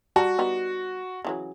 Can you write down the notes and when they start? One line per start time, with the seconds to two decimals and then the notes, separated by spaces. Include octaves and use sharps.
0.16 G3 F#4 A5 A#5
0.39 G3 B3 D#4
1.24 C#3 E3 F#3